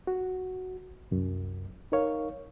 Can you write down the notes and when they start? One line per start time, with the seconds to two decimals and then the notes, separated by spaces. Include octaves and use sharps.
0.07 F#4
1.11 C2 F#2
1.92 D#4 A#4 C#5 F5